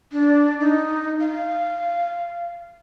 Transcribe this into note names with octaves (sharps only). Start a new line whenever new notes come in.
D4
D#4
F5